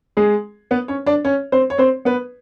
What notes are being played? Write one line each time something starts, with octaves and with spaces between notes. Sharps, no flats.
G#3 G#4
B3 B4
C#4 C#5
D4 D5
C#4 C#5
C4 C5
C#5
C4 C5
B3 B4